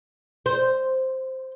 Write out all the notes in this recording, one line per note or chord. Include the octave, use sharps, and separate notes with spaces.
C5